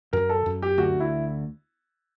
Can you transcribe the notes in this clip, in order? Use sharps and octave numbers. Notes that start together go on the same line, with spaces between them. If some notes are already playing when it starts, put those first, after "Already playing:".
F#2 A#4
A4
F#2
G4
D2 F#4
E4